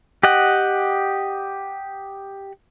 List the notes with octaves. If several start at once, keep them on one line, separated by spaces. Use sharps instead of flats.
G4 D#5 F#5